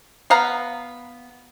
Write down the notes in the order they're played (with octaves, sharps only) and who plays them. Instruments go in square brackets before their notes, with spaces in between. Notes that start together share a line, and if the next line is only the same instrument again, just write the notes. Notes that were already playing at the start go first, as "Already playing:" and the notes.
[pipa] B3 F5 F#5 A#5